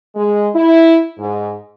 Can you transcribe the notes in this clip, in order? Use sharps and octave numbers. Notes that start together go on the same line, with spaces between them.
G#3
E4
G#2